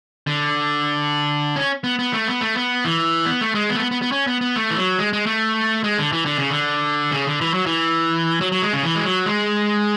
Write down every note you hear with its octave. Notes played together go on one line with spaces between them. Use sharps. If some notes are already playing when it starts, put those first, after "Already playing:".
D3
C#4
B3
B3
A3
B3
A3
B3
E3
B3
A3
G#3
B3
A3
B3
B3
B3
C#4
B3
B3
A3
E3
F#3
G#3
G#3
A3
G#3
D3
E3
D3
C#3
D3
C#3
D3
E3
F#3
E3
F#3
F#3
G#3
C#3
E3
G#3
F#3
G#3